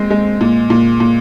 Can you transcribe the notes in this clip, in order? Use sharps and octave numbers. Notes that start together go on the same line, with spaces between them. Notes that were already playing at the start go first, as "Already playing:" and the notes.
Already playing: A#2 G#3 C4
G#3
A#2
A#2
A#2